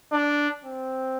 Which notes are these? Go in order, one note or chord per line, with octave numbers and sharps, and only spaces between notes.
D4
C4